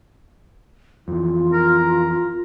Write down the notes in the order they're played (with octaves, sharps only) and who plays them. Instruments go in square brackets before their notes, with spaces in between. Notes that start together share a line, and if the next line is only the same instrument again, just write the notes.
[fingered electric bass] F2 E3 [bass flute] F4
[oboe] A#4